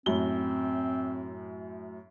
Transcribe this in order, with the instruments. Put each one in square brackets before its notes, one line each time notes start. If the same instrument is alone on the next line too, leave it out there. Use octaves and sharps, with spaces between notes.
[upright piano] F#2 A2 G7 [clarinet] C4